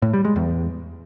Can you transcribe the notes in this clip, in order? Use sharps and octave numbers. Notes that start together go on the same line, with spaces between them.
A2
G3
G#3
E2